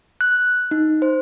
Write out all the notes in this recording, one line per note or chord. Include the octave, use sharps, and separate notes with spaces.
F#6
D#4
C5